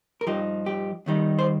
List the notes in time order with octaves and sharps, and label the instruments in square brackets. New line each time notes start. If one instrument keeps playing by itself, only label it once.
[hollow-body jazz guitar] A#4
G2 F3 D#4 G4
G4
D#2 D#3 G3 D#4
C5